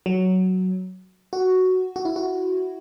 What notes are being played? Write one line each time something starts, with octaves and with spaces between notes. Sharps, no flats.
F#3
F#4
F#4
E4
F#4